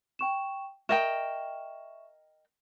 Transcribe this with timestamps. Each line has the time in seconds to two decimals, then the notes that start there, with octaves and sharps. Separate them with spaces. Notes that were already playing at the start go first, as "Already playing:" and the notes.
0.19 G5 C#6 E7
0.89 A#4 D#5 E5 G5 C#6 E7